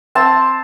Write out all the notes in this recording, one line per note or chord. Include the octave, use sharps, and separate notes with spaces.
C4 A5